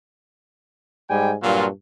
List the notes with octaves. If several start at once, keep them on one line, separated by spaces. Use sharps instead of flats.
G#2 G3 G5 G#5
G2 A#2 F#3 F4